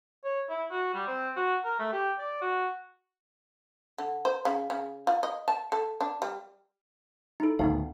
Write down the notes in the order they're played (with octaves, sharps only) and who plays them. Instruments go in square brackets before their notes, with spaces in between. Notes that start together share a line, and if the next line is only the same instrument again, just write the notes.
[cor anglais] C#5
E4
F#4
G3
C4
F#4
A#4
A3
G4
D5
F#4
[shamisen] D3
C5
C#3
C#3
F4
D#5
A5
A4
D4
G3
[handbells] D#4 E4 A4
[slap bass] D2 A2 D#3 [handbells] B3 D#4 F5